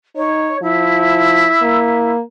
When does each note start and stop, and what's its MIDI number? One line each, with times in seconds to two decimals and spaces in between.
0.16 0.55 63
0.16 0.57 73
0.62 1.47 53
0.62 2.12 64
1.62 2.21 58